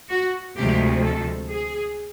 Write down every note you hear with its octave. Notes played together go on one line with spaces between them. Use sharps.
F#4
D2 C3 F3 G#3 G4
A4
G#4